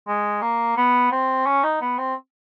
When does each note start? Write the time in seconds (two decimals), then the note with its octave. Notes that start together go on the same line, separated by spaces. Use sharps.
0.07 G#3
0.42 A#3
0.77 B3
1.12 C4
1.46 C#4
1.64 D#4
1.81 B3
1.99 C4